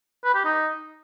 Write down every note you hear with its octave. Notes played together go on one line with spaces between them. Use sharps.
B4
G4
D#4